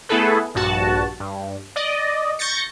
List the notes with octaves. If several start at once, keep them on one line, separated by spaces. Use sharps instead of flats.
A3 B3 E4 G#4 A4 B4
A#1 G2 F#4 A5
G2
D5 D#5
C#6 G6 A6 A#6 C#7